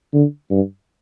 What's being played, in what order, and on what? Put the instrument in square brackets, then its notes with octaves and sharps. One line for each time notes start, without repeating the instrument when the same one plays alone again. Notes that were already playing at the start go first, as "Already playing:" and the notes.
[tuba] D3
G2